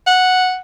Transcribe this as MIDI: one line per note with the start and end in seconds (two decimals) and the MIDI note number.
0.06 0.59 78